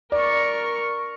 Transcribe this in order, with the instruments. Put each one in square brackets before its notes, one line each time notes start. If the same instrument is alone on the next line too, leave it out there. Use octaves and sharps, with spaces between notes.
[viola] A#4 C#6 [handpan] D5